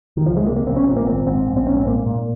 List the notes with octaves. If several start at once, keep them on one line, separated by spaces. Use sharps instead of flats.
D#3
C#2 F3
G#3
C3 A#3
A#3
A#1 C4
C#4
A#2 C4
A#3
G#1 C4
G#2 C4
A#1
C4
G#2 C#4
C4
A#2 A#3
A#2